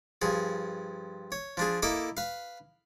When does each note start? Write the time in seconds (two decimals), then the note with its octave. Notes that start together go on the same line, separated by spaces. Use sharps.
0.22 G2 F3 G#4
1.32 C#5
1.57 F3 D4 G#4
1.82 A#3 E4 A4 D#5 A5 D6
2.17 B4 F5